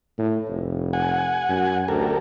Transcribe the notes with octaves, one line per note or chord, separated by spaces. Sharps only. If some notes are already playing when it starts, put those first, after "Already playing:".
A2
F1
F#5 G#5
F#2
D2 G4 A4 A#4